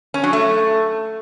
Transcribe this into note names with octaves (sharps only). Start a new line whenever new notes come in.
C#4
F#3
A3